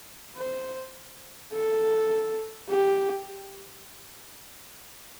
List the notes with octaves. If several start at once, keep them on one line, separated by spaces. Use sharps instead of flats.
C5
A4
G4